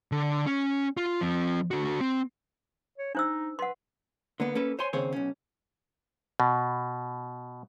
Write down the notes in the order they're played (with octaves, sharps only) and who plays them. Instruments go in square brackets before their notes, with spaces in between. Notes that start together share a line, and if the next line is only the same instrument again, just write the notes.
[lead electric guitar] D3
C#4
F4
F3 C4
D3 F#4
C4
[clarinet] C#5
[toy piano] D4 C5 E6 [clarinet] D#4
[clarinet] B4 [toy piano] F#5 C6
[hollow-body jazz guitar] D3 A#3 B3
A#3 C#4 A4 B4
C5 C#5 G#5 C6
D#2 C#3 C4 G#4 C5 C#5
B1 C#4
[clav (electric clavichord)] B2